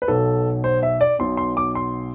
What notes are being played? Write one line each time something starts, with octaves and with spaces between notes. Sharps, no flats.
B4
B1 B2 A4
C5
E5
D5
B1 B2 C6
C6
D6
C6